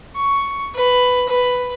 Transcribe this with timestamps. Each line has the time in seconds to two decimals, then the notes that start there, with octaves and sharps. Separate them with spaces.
0.16 C#6
0.75 B4
1.28 B4